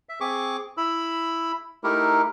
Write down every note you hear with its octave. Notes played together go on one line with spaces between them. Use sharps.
E5
C4 G#4 C#6 D6
E4 B5 E6
A3 D#4 E4 G4 A#4